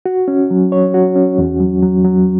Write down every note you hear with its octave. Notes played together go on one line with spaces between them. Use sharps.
F#4
C#4
F#3
C#5
F#4
C#4
E2
F#3
F#3
F#3